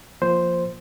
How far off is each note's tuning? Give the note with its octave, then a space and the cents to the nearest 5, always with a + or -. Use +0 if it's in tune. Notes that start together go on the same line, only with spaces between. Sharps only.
F3 +0 A#3 +0 C5 +0